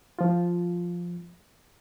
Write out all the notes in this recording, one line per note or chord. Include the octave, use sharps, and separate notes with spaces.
F3 F4